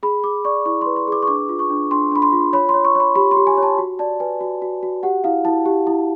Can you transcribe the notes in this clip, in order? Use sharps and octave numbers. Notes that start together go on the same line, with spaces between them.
G#4 B5
G#4 D6
D5 C#6
E4 C#6
B4 C6
C6
G#4 D6
C#6
D4 D6
F4
C#6
D4
D4 C6
D4 B5
C6
F4
C#5 B5
C6
C#5
C#6
C#5 B5
G4 B5
C6
G4
G#5
C#5
A5
F#4
D5 A5
B4 G#5
F#4
F#4
F#4
G4 F#5
E4 F5
E4 A5
G4
E4